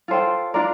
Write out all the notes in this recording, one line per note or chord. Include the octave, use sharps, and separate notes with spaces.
F4 A4 C5 G5
D4 F4 A#4 D5